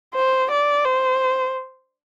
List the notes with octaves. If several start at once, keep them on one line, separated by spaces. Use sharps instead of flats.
C5
D5
C5